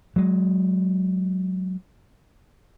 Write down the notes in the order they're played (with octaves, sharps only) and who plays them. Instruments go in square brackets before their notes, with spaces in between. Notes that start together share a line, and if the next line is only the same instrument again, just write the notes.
[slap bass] F#3 G#3